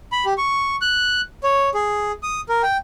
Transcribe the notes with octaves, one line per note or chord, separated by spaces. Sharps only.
B5
G4
C#6
F#6
C#5
G#4
D#6
A#4
G5